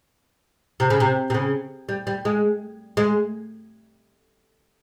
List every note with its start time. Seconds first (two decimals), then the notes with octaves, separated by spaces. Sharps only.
0.80 C3
0.90 C#3
1.00 C3
1.30 C3
1.34 C#3
1.89 G3
2.07 G3
2.25 G#3
2.97 G#3